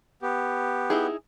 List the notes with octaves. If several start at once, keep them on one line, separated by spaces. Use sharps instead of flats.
B3 G4
D#4 E4 G#4